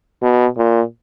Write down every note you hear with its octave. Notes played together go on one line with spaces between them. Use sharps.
B2
A#2